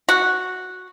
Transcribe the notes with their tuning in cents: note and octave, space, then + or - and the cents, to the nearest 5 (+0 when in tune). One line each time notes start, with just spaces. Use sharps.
F#4 -5